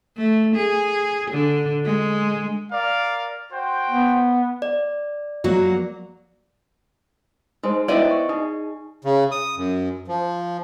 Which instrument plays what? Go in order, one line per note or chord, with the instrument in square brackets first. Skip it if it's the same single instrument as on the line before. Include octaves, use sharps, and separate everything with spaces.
[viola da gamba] A3
G#4
D3
G#3
[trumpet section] A#4 D5 F5
F#4 C5 G5
[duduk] B3
[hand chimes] D5
[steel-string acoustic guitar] F#3 A#3 F#4
[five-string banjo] G#3 [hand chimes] D#4 C5
[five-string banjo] B3 E4 G5 [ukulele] D5 D#5
[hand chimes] C#6
[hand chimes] D#4 [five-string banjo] G#4
[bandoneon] C#3
D#6
F#2
F3